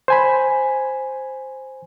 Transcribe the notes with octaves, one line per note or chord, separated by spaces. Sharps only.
C5 G#5 B5